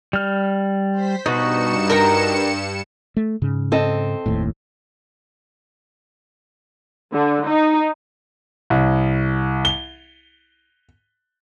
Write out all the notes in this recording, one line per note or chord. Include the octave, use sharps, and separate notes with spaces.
G3 F6
C5 B6
G2 B2 D#4 F#4 C#7 E7
A#4 G5 A#5
A3
G#2 C#3
C4 A4 D#5
F#1 D#2 A2
D3
D#4
C2
G7